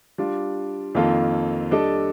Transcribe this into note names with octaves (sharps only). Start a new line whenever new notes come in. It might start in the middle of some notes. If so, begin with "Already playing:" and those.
G3 D4 F4
F2 D#3 A#3 F4 A4
G3 D4 A4 D#5